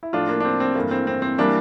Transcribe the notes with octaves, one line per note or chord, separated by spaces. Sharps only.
E4
A2 F3 A3 D4 F4
A#3 D4
D4
C4
C4
G2 E3 A3 A#3
C4
C4
C4
E3 G3 A#3 D4